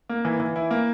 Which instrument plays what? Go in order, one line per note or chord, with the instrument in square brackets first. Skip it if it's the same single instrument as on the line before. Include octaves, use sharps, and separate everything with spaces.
[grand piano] A#3
E3
E3
E4
A#3